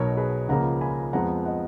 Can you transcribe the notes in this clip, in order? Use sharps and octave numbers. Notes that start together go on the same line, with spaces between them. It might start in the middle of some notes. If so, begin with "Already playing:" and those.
Already playing: B1 B2 F#3 A#4 C#5
G#4 B4
C#2 C#3 F3 A#3 F#5 A#5
G#5 B5
F2 F3 G#3 B3 F#5 A#5
D#5 F#5